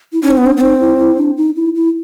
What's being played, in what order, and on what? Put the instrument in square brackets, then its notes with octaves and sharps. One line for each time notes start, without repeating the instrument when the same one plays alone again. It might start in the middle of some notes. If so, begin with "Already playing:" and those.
[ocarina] E4
[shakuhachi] C#4 [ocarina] D#4
[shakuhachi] C4
B3
[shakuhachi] C4 [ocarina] D4
[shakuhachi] B3
[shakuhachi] C4 [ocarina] D#4
[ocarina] E4
E4
D4
D#4
E4
E4